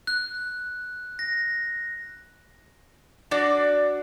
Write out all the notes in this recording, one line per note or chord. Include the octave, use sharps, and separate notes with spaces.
F#6
A#6
D4 F#4 D5